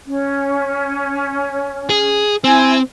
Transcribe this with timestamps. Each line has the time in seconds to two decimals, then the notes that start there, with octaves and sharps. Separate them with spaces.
0.05 C#4
1.89 G#4
2.44 C4 E4 G#5